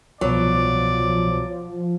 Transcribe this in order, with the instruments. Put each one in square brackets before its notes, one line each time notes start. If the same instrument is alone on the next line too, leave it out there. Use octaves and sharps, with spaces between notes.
[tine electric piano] C2 B2 [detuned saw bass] F3 [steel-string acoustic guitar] F#3 [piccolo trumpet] D5